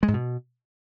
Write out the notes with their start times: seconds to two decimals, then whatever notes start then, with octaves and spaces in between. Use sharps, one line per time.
0.03 G#3
0.08 G#2
0.14 B2